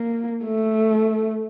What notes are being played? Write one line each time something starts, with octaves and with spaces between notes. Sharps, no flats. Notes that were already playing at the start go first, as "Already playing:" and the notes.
Already playing: A#3
A3